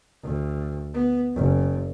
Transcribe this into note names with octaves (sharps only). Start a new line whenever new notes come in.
D2
B3
F#1